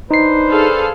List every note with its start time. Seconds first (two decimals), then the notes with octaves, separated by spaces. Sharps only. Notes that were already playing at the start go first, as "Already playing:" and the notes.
0.11 D4 D#4 B4 C5 C7
0.50 G#4 A4 F5